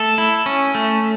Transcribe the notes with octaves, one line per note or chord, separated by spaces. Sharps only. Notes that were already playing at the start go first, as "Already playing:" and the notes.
Already playing: A3 A4
E4
C#4
A3